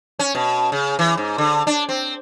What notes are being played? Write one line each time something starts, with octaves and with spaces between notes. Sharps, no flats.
C#4
B2
C#3
E3
G#2
D3
D4
C4